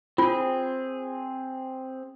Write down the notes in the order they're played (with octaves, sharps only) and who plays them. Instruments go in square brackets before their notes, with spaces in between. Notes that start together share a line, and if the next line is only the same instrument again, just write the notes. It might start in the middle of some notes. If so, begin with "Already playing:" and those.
[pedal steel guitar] C4 G#4 [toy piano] F4